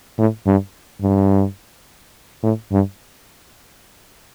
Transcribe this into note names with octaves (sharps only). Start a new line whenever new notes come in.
A2
G2
G2
A2
G2